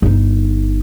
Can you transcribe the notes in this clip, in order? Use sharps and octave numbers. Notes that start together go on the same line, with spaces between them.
G1 D#4